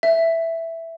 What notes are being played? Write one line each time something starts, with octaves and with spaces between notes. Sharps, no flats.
E5